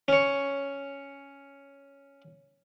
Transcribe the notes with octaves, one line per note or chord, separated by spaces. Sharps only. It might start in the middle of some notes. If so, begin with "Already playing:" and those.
C#4 C#5